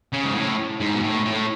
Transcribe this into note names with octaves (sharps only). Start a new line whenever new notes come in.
C#3
G#2
A2
G#2
B2
A2
A2